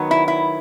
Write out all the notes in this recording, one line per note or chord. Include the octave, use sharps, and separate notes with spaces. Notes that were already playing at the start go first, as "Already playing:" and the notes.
Already playing: D#3 F#3 B3
E4
E4